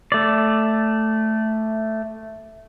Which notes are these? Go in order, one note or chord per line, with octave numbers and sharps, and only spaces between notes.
A3 D5